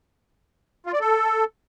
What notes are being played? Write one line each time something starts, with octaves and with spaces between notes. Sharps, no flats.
F4
D5
A4